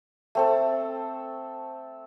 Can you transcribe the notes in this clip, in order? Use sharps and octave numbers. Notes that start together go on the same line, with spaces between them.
A3 C4 A4